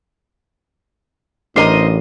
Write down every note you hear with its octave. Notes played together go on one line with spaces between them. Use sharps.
A1 D4 A#4 C5 D#5 A#5